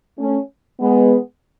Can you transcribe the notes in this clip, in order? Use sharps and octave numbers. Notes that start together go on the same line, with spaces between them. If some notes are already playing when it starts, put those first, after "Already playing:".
A3 C#4
G#3 B3